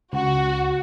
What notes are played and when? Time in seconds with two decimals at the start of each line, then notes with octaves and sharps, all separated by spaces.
0.13 C#2 F#4